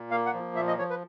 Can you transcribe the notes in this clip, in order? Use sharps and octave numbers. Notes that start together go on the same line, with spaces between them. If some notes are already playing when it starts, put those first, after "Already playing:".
Already playing: A#2
A#3 F5
F#5
F3
A#2 E5
D#5
F3 C#5
B4